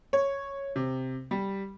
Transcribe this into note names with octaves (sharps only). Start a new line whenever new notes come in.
C#5
C3
G3